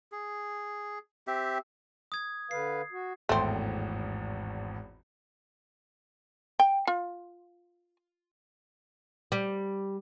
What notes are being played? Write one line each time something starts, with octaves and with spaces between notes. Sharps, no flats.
G#4
C4 G4 E5
D#6 G#6
D3 B4 F5 C7
F#4
G#1 E2 A2 A3 C4
G5
F4
G3